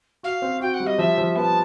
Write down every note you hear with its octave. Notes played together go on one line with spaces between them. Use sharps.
F#4 F5
C4
F#4 G5
F#5
G3
D#5
F3 E5
F3
B3 A5